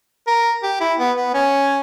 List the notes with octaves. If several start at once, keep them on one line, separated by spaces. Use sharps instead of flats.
A#4
G4
E4
B3
B3
C#4